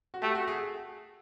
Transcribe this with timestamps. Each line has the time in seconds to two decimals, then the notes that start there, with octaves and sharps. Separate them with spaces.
0.14 F#4
0.22 A3 G4
0.35 F#4
0.48 G#4